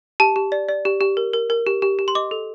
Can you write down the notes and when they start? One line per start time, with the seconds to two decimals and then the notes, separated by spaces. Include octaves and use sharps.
0.20 G4 A5
0.36 G4
0.52 D5
0.69 D5
0.85 G4
1.01 G4
1.17 A#4
1.33 A#4
1.50 A#4
1.67 G4
1.82 G4
1.99 G4
2.08 C6
2.15 D#5 D6
2.31 A4